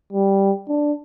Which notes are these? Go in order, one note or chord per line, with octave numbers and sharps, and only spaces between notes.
G3
D4